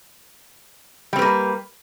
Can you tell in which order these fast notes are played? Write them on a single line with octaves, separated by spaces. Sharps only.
G3 C4 B4 A#3